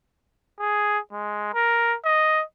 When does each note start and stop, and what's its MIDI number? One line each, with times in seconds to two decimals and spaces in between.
0.60 0.99 68
1.13 1.52 56
1.54 1.96 70
2.05 2.43 75